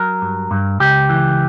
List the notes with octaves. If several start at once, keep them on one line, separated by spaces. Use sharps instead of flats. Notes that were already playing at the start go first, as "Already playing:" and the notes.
Already playing: F#3 A#4
G2
G2
C#2 G4
E3